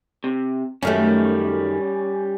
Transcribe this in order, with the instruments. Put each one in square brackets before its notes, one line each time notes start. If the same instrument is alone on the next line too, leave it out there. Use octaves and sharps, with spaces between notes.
[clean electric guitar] C3
[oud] F#2 D#3 A3 [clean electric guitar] G3 C#4